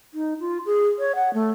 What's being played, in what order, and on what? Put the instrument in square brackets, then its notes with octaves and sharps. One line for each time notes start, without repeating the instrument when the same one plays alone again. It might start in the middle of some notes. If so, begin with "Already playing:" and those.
[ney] D#4
F4
G#4
C#5
F#5
A3